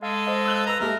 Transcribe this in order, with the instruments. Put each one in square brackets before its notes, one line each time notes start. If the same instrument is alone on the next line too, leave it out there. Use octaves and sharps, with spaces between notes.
[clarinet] G#3 [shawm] A4 [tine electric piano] F5
[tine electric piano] C5 D#5 F5
[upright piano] E6 F#6 G7
[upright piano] B4 E6 [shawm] A#5
[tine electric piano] G#3 A#3 G4 [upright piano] A4 E5 [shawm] A#4